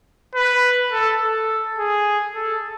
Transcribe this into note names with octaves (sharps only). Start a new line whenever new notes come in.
B4
A4
A4
G#4
A4